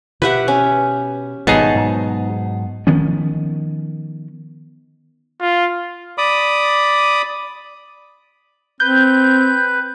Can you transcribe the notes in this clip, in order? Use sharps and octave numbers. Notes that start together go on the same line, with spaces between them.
B2 G4 B4 E5 F#5
C#4
G#1 B2 G3 B3 D#4 G#4 C#5 A5
G#2 B2 F#3
D#3 F3 B3 C#4
F4
D5 B5 D6 D#6
C4 B4 G6